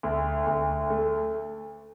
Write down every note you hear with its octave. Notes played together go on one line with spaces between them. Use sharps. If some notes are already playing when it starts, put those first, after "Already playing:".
D2
D2
A3